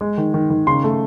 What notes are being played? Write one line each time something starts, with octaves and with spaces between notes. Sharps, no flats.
G#3
D#3
D#3
D#3
C#3 C6
A3